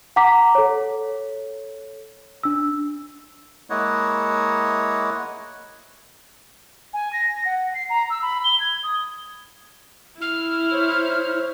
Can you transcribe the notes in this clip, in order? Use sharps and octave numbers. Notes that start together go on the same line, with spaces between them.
F#5 A#5 D6 B6
A4 C#5
D4 E6
G#3 A#3 E4 C#5 D#5 F#5
G#5
A#6
F#5
C7
A#5
E6
B5
G7
G#6
D#6
E4 F6
C5 C#5